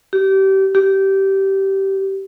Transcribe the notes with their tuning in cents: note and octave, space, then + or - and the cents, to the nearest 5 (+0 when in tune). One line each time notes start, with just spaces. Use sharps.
G4 -25
G4 -15